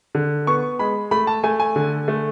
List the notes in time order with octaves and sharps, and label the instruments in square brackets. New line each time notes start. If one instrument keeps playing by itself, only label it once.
[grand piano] D3
B3 C#6
G#3 B5
A3 B5
A5
A3 G#5
G#5
D3
A3